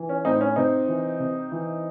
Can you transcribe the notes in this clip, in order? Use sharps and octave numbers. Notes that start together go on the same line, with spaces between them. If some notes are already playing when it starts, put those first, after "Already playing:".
Already playing: E3
C#4
A2 C4 D#4
C#4
C3 C4 D#4
E3
C3
E3